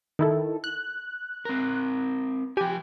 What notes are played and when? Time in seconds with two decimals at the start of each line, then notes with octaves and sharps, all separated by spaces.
0.19 D#3 E4 A4
0.64 F#6
1.45 C4 A#4
2.57 F3 G4 G#5